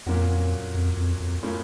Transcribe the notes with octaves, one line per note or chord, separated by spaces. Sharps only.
F2 A#2 F#3 A#3 C#4 F#4
F2
F2
F2
A2 A3 C#4 F4 A#4